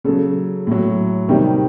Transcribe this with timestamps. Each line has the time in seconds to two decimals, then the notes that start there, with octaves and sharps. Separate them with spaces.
0.04 C#3 F#3 A4
0.67 A2 F#3
1.28 C3 D#3 G3